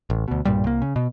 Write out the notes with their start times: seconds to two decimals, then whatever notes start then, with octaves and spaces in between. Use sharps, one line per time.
0.10 A1
0.28 D2 B2
0.45 B1 G2 A#2 G3
0.64 C2 A#3
0.82 C#3
0.96 B2